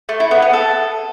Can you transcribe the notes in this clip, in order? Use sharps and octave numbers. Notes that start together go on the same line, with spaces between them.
A3
E4
B3
B3
A4